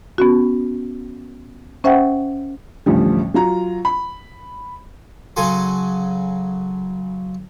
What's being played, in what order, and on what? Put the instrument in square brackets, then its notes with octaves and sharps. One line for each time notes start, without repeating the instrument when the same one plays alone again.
[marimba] B3 C#4 F#4
C#4 C5 E5 F#5 G5
[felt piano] A1 D2 F3 G3
F#3 F4 A#5
B5
[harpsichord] C#3 F#3 A4 G#5 C6